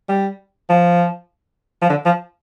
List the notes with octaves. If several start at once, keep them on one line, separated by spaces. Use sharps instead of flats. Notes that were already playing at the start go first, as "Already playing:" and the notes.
G3
F3
F3
D3
F3